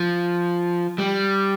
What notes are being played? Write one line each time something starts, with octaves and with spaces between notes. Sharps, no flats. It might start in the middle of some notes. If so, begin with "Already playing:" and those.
Already playing: F3
G3